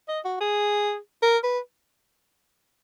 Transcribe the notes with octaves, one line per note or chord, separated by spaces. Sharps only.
D#5
F#4
G#4
A#4
B4